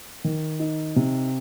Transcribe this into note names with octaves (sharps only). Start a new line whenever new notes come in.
D#3
D#4
C3